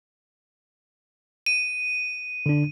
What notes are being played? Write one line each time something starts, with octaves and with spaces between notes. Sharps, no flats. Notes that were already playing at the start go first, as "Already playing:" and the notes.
D#7
D3 D4